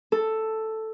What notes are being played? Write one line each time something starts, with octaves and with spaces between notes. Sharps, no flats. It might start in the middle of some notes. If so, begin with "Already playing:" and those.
A4